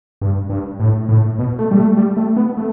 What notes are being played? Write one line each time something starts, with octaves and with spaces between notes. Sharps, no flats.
G2
G2
A2
A2
B2
A3
G3
A3
G3
A3
B3
A3